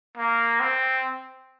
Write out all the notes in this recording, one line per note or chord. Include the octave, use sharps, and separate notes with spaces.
A#3
C4